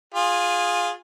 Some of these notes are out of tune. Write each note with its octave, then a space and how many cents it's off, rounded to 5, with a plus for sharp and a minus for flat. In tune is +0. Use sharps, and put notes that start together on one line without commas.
F4 +15 G#4 -10